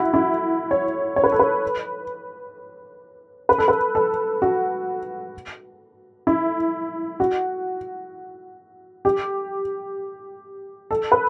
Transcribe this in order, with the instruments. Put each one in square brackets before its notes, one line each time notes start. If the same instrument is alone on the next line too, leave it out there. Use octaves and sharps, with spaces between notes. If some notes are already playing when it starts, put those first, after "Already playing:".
Already playing: [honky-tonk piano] E4 F#4
E4
C#5
C#5
B4
A4
B4
B4
A4
B4
A4
F#4
E4
F#4
G4
A4
B4